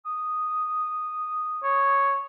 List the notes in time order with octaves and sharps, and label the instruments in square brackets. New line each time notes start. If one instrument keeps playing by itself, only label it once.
[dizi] D#6
[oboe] C#5